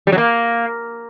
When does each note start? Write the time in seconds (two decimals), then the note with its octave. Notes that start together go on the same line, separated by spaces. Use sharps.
0.07 G3
0.12 F#3
0.18 A#3